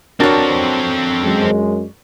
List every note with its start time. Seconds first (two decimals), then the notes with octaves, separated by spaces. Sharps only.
0.20 C4 D4 F#4 A4 A#4 C#5
1.22 F#2 G#3